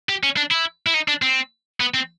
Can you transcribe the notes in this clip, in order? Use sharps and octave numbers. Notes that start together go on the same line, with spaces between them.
G4
C#4
D4
E4
E4
D#4
D4
C4
B3
C4